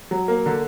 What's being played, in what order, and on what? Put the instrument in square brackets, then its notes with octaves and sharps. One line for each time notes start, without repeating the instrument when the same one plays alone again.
[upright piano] F#3
A#3
D3